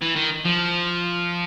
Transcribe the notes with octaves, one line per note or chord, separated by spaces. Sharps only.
E3
D#3
F3